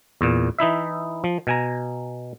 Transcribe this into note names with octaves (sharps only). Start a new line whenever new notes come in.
E2 A#2
E3 D#4 E4 E5
F3
B2 G#5 A#5